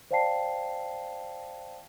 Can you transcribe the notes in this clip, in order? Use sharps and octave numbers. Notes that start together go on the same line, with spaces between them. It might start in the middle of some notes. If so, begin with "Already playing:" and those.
C5 D5 F5 G5 A5 C7